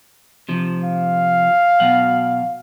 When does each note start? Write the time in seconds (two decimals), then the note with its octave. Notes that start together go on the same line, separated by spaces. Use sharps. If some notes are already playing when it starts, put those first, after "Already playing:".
0.49 C3 F3
0.84 F5
1.80 B2 F#3 F#5